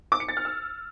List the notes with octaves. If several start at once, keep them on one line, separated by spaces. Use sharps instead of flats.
D6
C#7
A6
F6
E6